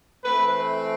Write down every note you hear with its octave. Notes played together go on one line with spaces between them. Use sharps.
E3 A3 C4 B4